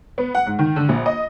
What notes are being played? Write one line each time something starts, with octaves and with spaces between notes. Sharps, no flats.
B3
F#5
G#2
D#3
D3
A#1
D#5